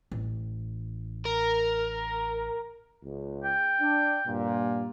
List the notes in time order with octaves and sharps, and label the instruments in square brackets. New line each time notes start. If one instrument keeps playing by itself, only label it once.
[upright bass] A1
[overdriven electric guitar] A#4
[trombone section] C#2
[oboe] G5
[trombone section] D4
G2 A#2